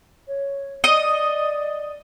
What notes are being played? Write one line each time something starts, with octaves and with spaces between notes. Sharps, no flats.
C#5
D5 D#5